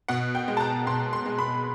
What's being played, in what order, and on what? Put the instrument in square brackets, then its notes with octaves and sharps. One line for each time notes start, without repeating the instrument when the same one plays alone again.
[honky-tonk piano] B2 F#5
G5
G#3
A5
A#5
B2 C6
C6
G#3
B5